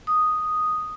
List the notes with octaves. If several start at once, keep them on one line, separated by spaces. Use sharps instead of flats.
D#6